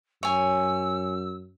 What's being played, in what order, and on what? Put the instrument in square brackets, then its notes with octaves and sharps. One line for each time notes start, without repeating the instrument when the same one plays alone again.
[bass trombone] F#2 [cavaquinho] C#5 G#5 [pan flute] E6